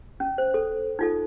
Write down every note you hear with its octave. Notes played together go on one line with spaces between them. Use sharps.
C#4
C5
A4
D#4 F4 A4